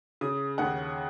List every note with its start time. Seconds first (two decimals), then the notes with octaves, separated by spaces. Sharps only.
0.21 C#3 D#6
0.58 D#2 F#5